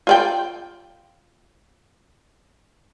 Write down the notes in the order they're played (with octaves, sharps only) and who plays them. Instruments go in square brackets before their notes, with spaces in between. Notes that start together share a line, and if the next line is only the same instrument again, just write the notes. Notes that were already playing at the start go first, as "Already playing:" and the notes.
[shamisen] F4 D5 G5